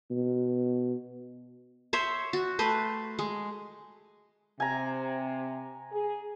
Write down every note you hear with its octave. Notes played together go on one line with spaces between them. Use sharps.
B2
C5 C#5 E5
F#4
A3 B4 C5
G#3
C3 G#5 A#5
G#4